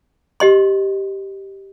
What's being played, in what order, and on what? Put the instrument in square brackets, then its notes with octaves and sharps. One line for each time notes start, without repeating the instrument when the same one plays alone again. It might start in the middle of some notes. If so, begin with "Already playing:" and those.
[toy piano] G4 D#5 C6